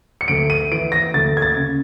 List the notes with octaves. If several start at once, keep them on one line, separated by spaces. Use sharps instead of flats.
C#7
D2 D7
D#7
E3 D7
A#6
D2 A6
G#6
A6
C#3